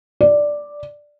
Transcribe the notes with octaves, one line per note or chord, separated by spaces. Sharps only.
D5